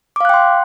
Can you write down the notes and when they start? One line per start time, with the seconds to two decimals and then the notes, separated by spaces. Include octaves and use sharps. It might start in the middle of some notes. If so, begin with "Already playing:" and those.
0.16 D6
0.20 F5
0.25 F#6
0.29 G5
0.34 C6